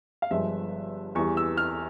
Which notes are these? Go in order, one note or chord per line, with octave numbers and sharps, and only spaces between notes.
F5
G1 G2 F3 G#3 E5
E2 E3 G3 C#6
E6
F6